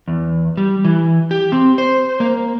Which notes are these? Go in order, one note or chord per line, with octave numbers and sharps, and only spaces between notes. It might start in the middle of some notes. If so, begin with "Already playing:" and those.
E2
G3
E3
G4
C4
C5
A#3